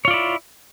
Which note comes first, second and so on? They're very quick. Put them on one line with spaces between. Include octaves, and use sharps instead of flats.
C#5 F4 D5 E4